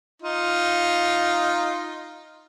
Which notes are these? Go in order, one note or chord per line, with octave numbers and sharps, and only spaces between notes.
D#4 F4